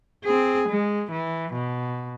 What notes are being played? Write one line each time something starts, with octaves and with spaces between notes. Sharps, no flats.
C4 G#4
G#3
E3
B2